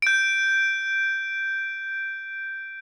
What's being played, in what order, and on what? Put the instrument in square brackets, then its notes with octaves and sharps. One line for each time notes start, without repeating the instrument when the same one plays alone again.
[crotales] G6 D7